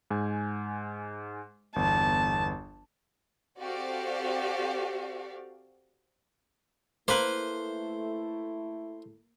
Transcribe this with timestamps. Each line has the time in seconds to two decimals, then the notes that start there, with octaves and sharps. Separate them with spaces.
0.11 G#2 G#5
1.76 G1 E2 A5
3.60 C4 F#4 G4 A4 D5 F5
7.08 A3 A#3 E4 B4 C5